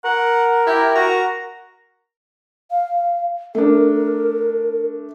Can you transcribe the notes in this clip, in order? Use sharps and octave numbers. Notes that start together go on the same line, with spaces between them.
A#4 F#5
E4 G4
F#4 A#5
F5
A3 D4 A#4